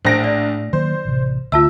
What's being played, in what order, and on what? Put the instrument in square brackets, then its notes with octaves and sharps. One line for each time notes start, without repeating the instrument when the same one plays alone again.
[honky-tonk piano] A#1 A#6 D7 [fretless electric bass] A2 [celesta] C5
[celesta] D5
[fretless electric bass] D#3 F#3 A#3 [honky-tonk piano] C5
[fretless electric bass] A1 C3
[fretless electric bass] D2 [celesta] F4 A5 E6 [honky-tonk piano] E5